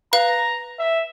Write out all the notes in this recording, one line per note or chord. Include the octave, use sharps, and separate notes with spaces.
B4 F5 A#5
E5